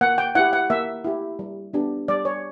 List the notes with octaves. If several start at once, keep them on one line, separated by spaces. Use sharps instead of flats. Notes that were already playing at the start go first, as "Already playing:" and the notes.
A#3 F#5
G5
E4 G4 F#5
F#5
A#3 E5
E4 G4
G3
B3 D4 G4
G3 D5
C#5